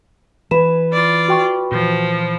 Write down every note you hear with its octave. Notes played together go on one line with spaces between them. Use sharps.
E3 B4 G#5 E7
F4 D5
F#4 G5 C#6
A#2 E3 F3